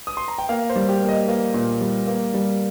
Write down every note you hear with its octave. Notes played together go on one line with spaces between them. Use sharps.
D#6
C6
A#5
G5
A#3 F5
C5
G3
G4
A#3
D#5
A#3
A#2
G3
A#3
G3